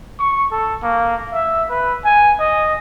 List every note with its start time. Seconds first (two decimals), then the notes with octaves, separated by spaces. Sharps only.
0.19 C#6
0.52 A4
0.83 A#3
1.33 E5
1.69 B4
2.05 G#5
2.40 D#5